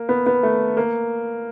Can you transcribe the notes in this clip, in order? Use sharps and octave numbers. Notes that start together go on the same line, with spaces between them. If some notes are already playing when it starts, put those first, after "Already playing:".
Already playing: A#3
B3
B3
A3
A#3